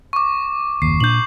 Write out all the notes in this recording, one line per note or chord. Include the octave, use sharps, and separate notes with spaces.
C#6 D6
F#1 D#2 C7
A#2 D4 G6 F#7